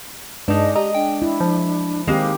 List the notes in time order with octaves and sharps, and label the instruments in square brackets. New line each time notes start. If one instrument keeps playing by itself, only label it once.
[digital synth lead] G2 [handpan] G#3 [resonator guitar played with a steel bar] D4 D#4 [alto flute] D#5
[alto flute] G4 [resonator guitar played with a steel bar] D#5 [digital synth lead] A#5
[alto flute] D4 [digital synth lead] G5
[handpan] E4
[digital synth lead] F3
[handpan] D#3 C4 G4 [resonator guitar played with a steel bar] G#3 A#3 [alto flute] F5